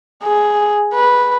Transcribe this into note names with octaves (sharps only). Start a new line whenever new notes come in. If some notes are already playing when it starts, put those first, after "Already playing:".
G#4
B4